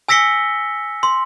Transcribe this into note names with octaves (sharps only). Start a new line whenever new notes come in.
G#5 E6 A#6 B6 C#7 G7
C6